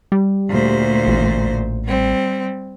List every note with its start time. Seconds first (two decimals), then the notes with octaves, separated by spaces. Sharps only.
0.12 G3
0.48 D2 A#2 C5
1.07 A1
1.84 G3 C4